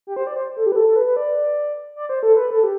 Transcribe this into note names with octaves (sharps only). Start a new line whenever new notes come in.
G4
C5
D5
C5
A4
G4
B4
A4
A4
B4
B4
D5
D5
C5
A4
B4
A4
G4